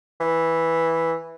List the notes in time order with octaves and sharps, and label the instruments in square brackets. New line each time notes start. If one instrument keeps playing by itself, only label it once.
[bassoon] E3